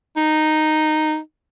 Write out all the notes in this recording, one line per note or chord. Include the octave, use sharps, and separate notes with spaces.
D#4